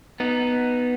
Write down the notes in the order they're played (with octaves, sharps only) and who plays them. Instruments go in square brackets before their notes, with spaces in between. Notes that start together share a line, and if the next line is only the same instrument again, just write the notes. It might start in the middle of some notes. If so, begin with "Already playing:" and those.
[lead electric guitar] B3 D#4